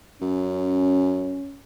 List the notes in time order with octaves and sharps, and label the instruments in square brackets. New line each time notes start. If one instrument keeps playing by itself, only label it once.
[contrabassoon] F#2 [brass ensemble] C#4